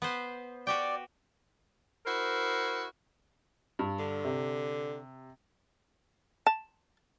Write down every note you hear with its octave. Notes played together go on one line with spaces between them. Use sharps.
B3 B4 C5
F#4 G4 D5 G5
E4 F#4 A#4 C5
G2
D3
C3
A5